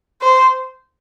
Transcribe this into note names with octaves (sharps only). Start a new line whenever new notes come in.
C5